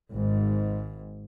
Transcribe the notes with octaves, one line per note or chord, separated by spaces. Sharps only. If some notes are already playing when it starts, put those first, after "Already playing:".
G#1 G#2